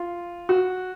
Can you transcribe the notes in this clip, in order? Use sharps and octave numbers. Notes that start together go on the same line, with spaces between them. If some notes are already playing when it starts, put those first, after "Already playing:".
Already playing: F4
F#4